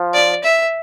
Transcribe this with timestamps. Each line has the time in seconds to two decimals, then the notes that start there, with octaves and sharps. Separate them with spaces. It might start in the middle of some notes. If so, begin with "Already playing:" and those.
Already playing: F3
0.14 D5
0.44 E5